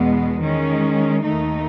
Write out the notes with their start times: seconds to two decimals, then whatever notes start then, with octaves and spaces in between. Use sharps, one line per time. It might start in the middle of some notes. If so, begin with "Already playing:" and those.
Already playing: E2 B2 G#3 B3
0.43 D#3 G#3 C#4
1.24 D#2 D#3 A3 D#4